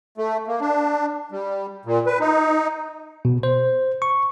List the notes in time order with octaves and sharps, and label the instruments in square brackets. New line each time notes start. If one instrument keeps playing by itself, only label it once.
[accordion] A3
A#3
D4
G3
A#2
B4
D#4
[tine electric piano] B2
C5
C#6